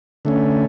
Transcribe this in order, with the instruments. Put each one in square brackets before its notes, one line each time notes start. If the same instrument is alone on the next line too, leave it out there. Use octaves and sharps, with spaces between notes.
[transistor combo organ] D3 A3 C#4